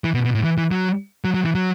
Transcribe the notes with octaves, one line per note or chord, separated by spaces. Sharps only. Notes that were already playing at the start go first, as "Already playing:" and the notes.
E3
B2
B2
A2
E3
E3
F#3
F#3
F#3
E3
F#3